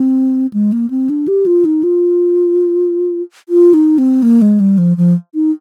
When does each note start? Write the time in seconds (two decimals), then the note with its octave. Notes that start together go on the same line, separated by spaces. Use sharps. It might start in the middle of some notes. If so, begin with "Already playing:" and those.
Already playing: C4
0.53 G#3
0.72 A#3
0.90 C4
1.09 D4
1.28 G4
1.46 F4
1.65 D#4
1.83 F4
3.49 F4
3.74 D#4
3.98 C4
4.22 A#3
4.42 G#3
4.60 G3
4.78 F3
4.97 F3
5.34 D#4